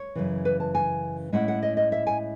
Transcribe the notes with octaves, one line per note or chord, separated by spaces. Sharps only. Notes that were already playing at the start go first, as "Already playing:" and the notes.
Already playing: C#5
F#2 C#3 E3
B4
A5
G#5
A2 G#3 C#4 E4 F#5
F#5
D#5
D#5
E5
G#5